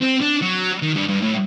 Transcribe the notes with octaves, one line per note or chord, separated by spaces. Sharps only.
C4
D4
F#3
D#3
G2
G2
A2